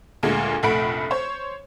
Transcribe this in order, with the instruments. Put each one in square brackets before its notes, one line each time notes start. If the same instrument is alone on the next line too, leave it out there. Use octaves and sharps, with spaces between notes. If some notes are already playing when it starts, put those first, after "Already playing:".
[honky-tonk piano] D2 A#2 G#3
F1 A#1 A3 F#5 B5 D7
C5 C#5